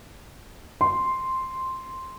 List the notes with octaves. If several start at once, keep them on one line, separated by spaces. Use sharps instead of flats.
C6